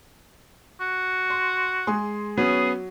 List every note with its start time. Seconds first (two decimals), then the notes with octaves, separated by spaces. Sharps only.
0.80 F#4
1.30 C6
1.87 G#3 G#4 C6
2.38 F#3 B3 C#4 G#4